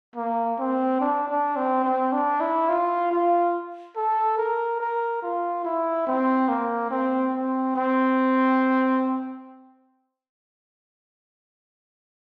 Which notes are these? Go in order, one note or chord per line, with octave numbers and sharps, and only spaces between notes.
A#3
C4
D4
D4
C4
C4
D4
E4
F4
F4
A4
A#4
A#4
F4
E4
C4
A#3
C4
C4
C4